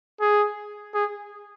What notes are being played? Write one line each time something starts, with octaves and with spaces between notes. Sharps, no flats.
G#4
G#4